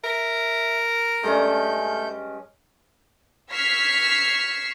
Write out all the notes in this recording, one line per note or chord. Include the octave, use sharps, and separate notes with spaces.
A#4 E5
G2 G#3 A3 C#4 A4 G6
C#6 E6 F6 G#6 B6 C7